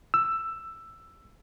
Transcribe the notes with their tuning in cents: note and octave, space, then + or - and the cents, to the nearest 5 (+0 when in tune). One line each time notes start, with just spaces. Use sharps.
E6 +10